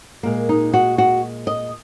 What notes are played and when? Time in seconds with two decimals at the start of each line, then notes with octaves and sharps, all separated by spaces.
0.23 A#2 G#3 A#3
0.49 D#4
0.74 F#4
0.98 F#4
1.47 D#5